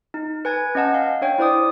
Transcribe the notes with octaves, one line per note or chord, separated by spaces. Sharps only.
D#4
B4 G#5 G#6
C#4 D#5 F#5 A5
F5
D4 C#5 G5
E4 C5 D5 D#6